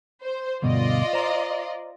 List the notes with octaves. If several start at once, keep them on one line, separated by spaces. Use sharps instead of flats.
C5
D2 G2 B2 F4 D5 D#5
C5 A#5